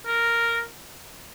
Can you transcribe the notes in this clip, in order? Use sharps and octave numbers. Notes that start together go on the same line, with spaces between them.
A#4